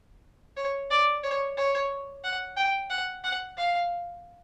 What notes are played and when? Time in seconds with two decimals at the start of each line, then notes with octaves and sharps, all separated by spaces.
0.57 C#5
0.90 D5
1.24 C#5
1.57 C#5
2.24 F#5
2.57 G5
2.90 F#5
3.24 F#5
3.57 F5